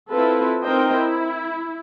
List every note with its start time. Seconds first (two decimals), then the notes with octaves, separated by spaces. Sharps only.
0.10 C4 E4 F4 A4 B4
0.64 C4 D#4 A#4 C5 D#5 G5
0.94 E4